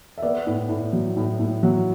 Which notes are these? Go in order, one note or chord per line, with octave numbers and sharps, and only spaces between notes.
E5
B3 D5
A2
A2
F#3
A2
A2
F#3